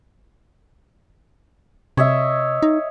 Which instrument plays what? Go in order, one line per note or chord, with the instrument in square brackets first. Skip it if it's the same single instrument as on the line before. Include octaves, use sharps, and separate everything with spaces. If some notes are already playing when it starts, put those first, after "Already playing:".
[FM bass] C3 [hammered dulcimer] C#5 D#5 E5
[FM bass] D#4